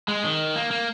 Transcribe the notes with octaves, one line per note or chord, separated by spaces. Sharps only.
G#3
D#3
A#3
A#3